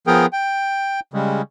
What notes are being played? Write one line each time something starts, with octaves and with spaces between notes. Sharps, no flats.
F3 B3 G#4 A#4 G5
G5
C#3 G3 G#3